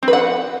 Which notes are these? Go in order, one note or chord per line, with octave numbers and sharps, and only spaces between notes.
C4
B4
F#5